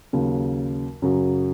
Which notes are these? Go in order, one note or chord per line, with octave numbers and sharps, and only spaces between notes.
D#2 C#3 F#3
F#2 C#3 F#3